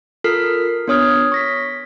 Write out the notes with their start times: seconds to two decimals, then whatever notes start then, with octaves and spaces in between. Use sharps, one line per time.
0.24 F4 A4 A#4 F6 B6 C7
0.88 B3 D4 C#5 D#6 F6 G#6
1.32 C#6 A#6 B6